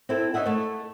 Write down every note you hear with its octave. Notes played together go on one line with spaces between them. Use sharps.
C4 E4 A4
C#4 D#4 D#5 E5 F#5
A3 A4